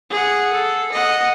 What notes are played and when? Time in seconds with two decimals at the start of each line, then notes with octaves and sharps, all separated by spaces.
0.10 G#4 F#5
0.53 A4
0.92 D#5 F#5